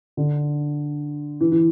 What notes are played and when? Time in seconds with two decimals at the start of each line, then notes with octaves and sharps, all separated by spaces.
0.17 D3
1.41 E3
1.52 E3